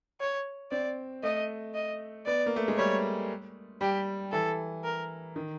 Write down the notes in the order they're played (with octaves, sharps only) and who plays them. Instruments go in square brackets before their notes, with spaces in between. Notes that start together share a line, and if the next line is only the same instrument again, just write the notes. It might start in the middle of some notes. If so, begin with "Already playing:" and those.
[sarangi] C#5
[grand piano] C4 [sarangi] D5
[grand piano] A3 [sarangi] D#5
[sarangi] D#5
[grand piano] B3 [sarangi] D5
[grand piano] A#3
A3
G#3
[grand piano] G3 [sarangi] C#5
[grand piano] G3 [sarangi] G4
[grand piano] E3 [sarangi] A4
[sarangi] A#4
[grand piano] D#3